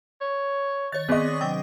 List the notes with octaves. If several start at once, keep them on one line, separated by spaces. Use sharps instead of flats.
C#5
D#3 C#5 A6
D#3 B3 C4 G#4 D5 D#5 C#6
C3 F#3 D4 G5